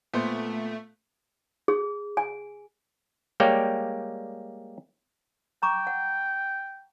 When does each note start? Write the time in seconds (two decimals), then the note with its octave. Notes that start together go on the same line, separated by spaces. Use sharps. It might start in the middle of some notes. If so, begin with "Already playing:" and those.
0.13 A#2 A3 B3 C5
1.68 G#4
2.17 G#5
3.40 G3 G#3 A#3 C#5 D5 G5
5.63 G5 A#5 C#6 D6
5.87 F#5